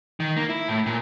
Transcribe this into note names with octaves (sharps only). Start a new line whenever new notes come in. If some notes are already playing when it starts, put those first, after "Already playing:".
D#3
A#3
E4
A2
A#2